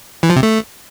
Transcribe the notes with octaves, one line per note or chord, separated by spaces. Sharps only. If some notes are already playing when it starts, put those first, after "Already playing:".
E3
F3
C3
A3